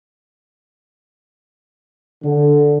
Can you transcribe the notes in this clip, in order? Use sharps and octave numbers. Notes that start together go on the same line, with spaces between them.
D3